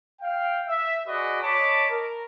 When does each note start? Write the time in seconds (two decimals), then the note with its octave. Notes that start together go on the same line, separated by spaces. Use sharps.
0.22 F5 G5
0.68 E5
1.07 F#4 G#4 B4 D5 D#5
1.43 C#5 D#5 A5 B5 D6
1.90 A#4